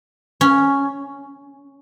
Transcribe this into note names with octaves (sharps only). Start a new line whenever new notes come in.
C#4